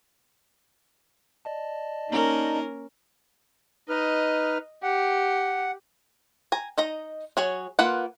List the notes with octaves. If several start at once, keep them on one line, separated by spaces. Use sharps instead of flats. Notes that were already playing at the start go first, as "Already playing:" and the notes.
D5 D#5 A5
A#3 C#4 D#4 A#4
D#4 B4 D#5 F6
G4 F#5
G#5 A#5
D#4 D#5 A#5
F#3 G#4 C#5
A#3 F4 B4 F#5